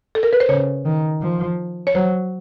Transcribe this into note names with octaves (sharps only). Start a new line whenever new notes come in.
A4
A#4
B4
C5
C#3 C#5
D#3
F3
C#5
F#3 C5